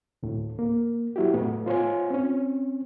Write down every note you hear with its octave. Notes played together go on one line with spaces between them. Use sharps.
D2 A2
A#3
F#3 E4 F#4 G4
A2 A3 B3
F4 C5 C#5 G#5
C4 C#4